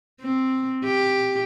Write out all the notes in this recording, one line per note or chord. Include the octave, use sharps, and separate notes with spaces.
C4
G4